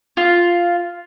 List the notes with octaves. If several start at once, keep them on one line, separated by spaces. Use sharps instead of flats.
F4